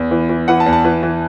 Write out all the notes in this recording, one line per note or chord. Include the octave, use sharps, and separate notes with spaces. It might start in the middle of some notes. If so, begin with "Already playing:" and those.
Already playing: E2
E3
E3
E3 F#5
A5
E2
A5
E3
E3